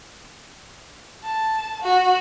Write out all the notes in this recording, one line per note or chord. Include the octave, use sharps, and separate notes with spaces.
A5
F#4